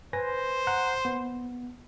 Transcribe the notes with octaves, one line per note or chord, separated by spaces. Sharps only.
B4 C5 G#5 A#6
F#5 A#5 F#6
B3